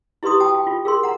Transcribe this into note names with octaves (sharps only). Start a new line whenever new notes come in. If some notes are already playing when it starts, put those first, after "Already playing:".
E4 G4 B4 C6 D#6
F#4 G5 A5 D#6
G5
F4
G#4 A#4 C6
F#5 A#5